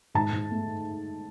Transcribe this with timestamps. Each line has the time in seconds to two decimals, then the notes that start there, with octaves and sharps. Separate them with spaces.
0.15 G#2 A5
0.32 G#2
0.51 A3